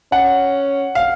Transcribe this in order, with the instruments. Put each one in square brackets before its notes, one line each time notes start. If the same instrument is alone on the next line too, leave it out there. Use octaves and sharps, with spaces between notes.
[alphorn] C#4 [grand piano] F#5
[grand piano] F5